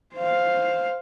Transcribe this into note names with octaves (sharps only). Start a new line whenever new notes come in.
C5 F5